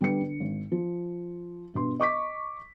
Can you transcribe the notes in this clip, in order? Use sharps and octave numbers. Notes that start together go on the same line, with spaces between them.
D3 G3 B3 B4 C#7
D3
G#1
F3
G2 B2 C6
D#5 C#6 D6 B6